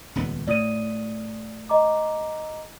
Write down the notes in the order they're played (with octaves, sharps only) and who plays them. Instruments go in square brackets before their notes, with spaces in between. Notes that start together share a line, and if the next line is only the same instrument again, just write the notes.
[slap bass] D#1 C#2 B3
[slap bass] A2 [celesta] D5 D#6 D#7
[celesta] D#5 A#5 D6